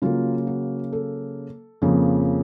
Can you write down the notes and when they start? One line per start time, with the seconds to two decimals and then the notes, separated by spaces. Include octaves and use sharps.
0.02 C#3 F#3 A#3 F4
0.47 F#4
0.93 A4
1.82 F2 C#3 F3 A#3